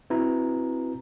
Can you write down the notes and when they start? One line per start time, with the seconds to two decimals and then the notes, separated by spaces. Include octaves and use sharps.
0.10 C4 E4 F#4 B4 A#5